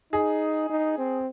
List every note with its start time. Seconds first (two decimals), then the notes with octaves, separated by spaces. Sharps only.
0.13 D#4 G#4
0.70 D#4
0.98 C4